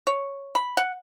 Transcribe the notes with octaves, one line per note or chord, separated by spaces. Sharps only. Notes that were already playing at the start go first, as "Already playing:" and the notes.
C#5
B5
F#5